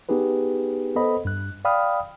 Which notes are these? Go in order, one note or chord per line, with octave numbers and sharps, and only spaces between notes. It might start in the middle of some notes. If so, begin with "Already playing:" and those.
B3 D#4 G4 G#4 B4
B3 A4 C5 D#5 B5
G2 F#6
D5 F5 G5 B5 D#6 F6